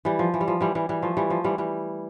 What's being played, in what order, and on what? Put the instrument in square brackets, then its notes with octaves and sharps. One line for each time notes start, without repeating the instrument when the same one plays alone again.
[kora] E3 G3
F3
E3
G3
F3
E3 G3
E3 G3
E3 G3
F3 A3
E3 G3
F3
E3 G3
E3 G3